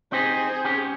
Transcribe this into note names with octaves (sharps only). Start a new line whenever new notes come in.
C4 D#4 G4 G#4 C5
C#4 G4